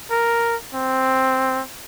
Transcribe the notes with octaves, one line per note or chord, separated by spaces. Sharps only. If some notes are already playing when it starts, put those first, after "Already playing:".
A#4
C4